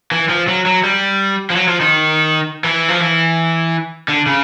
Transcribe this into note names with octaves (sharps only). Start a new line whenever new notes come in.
E3
F3
F#3
F#3
G3
F3
F#3
F3
D#3
E3
F3
E3
D3
C#3